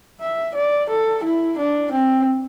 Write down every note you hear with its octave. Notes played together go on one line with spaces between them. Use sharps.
E5
D5
A4
E4
D4
C4